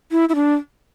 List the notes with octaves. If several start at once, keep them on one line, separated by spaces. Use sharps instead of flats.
E4
E4
D4